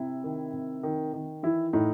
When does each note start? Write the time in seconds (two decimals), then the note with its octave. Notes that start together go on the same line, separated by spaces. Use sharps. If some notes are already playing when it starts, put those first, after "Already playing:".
Already playing: C3 E4
0.24 D#3
0.53 C3
0.83 D#3
1.13 D#3
1.43 E3 E4
1.73 A2 D#4